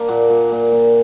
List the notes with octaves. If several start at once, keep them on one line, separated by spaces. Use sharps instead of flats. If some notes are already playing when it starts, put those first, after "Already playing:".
Already playing: A#3 D4
A#2 F#5
A#2
A#2
A#2